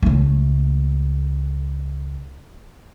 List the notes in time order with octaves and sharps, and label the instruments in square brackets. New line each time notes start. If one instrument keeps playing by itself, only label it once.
[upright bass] C#2 A3